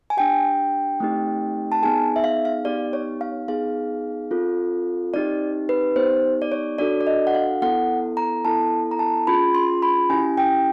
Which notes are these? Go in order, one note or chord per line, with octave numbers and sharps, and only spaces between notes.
G#5
D4 G4 G5
A3 C4 D#4 G4
A5
B3 D#4 G#4 G#5
E5
F5
F5
B3 D#4 G4 D5
C#5
F5
B3 D#4 G#4 F5
C4 F4 A4
C4 D#4 G4 D5
B4
B3 D#4 G4 C5
D5
C#5
D4 F#4 A4 D5
D5
D#5
F#5
F5
B3 E4 A4 F#5
A#5
B3 E4 A4 A5
A#5
A5
C#4 F4 G#4 B5
C6
B5
C#4 E4 G4 G#5
G5